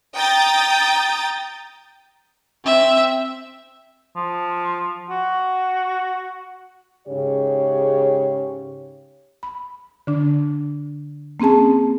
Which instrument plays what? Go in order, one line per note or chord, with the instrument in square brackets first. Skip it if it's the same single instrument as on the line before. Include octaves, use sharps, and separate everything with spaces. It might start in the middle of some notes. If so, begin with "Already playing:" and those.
[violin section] G5 A#5 D#6 G6 A6
[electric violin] C4 E5
[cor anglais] F3
F#4
[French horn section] G#2 C#3 G4 C#5
[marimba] B5
D3 D4
A#3 C4 C#4 G#4 A5